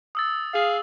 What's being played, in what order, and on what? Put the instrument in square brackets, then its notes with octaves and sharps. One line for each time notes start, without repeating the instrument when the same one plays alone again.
[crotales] D#6 E6 A6
[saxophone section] G#4 F5